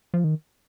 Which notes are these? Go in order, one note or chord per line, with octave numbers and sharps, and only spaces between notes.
F3
D#3